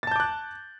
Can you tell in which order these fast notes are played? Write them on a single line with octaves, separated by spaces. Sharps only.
A6 A5 G6 D6 F#6